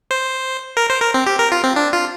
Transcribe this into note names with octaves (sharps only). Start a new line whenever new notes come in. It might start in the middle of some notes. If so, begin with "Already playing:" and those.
C5
A#4
C5
A#4
C4
G4
A#4
F4
C4
D4
F4